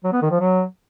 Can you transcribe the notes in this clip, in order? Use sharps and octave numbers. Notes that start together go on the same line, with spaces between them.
F#3
B3
D#3
F3
F#3